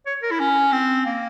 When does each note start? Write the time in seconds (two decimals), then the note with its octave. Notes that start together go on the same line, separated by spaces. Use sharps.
0.07 C#5
0.23 A#4
0.31 E4
0.40 C#4
0.72 C4
1.06 A#3